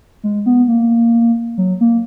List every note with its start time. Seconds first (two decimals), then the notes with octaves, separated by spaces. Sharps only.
0.23 G#3
0.46 B3
0.68 A#3
1.58 F#3
1.81 A#3